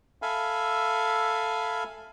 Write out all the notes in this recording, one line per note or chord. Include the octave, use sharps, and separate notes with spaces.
A4 E5 F5 G#5 B5